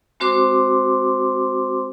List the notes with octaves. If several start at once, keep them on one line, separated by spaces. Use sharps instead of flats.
G#3 C4 F#4 C5 C6 D6